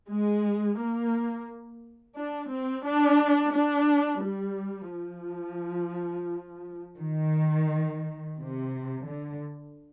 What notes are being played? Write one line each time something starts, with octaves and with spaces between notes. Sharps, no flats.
G#3
A#3
D4
C4
D4
D4
G3
F3
D#3
C3
D3